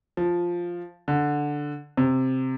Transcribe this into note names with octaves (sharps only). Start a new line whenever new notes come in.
F3
D3
C3